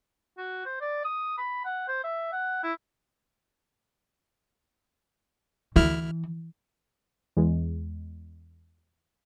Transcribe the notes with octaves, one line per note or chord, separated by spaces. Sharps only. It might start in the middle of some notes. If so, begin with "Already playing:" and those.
F#4
C5
D5
D#6
B5
F#5
C5
E5
F#5
E4
D2 E3 E4 F6
E2 G#3